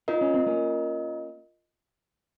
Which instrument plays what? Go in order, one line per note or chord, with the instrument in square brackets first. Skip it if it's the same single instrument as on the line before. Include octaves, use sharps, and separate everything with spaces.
[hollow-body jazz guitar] D#4 [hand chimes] F4 A#4 D#5
[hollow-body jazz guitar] C#4
C4
A#3 C#4